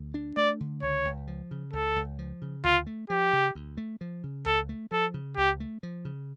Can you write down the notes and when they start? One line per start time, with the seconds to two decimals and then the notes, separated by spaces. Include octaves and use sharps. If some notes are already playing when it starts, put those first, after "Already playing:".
Already playing: D2
0.14 D4
0.37 A3 D5
0.60 D3
0.82 C#2 C#5
1.05 C#2
1.27 F3
1.51 C#3
1.73 C#2 A4
1.96 C#2
2.19 F3
2.42 C#3
2.64 D2 F4
2.86 A3
3.10 F3 G4
3.33 C#3
3.55 D2
3.77 A3
4.01 F3
4.24 C#3
4.46 C#2 A4
4.69 A3
4.91 F3 A4
5.14 C#3
5.37 C#2 G4
5.60 A3
5.83 F3
6.05 C#3